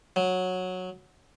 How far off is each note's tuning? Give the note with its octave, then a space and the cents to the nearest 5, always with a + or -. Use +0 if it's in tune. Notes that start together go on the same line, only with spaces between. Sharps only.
F#3 -10